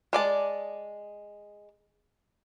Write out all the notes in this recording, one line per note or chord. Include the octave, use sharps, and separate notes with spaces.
G#3 D5 A5